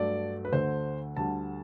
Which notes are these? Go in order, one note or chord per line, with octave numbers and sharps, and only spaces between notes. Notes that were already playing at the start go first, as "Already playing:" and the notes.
Already playing: G2 F#3 A3 D5
B4
D2 D3 A3 C5
D2 D3 G3 A5